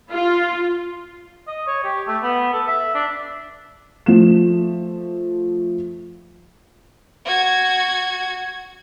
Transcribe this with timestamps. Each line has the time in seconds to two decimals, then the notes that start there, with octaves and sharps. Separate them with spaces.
0.11 F4
1.48 D#5
1.67 C#5
1.84 G4
2.08 A3
2.23 B3
2.53 A4
2.68 E5
2.95 D4
4.06 F3 A3 E7
7.25 F#4 G#6